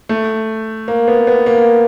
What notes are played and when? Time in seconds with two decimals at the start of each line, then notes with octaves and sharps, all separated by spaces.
0.09 A3
0.88 A#3
1.08 B3
1.27 B3
1.46 A#3